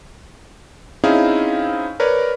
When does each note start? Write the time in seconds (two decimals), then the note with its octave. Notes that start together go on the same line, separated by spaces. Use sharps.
1.04 C4 C#4 D#4 E4 G#4 F5
2.00 A#4 B4 C#5 D5